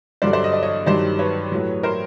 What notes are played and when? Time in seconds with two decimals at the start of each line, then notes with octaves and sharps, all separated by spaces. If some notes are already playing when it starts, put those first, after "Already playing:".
0.22 G2 D3 F#3 C5 D5
0.33 C5 D5
0.44 D#5
0.53 D5
0.63 C#5 D#5
0.86 G2 D#3 F#3 C5 D5
1.19 B4 C#5
1.52 A2 F#3
1.83 A#4 C5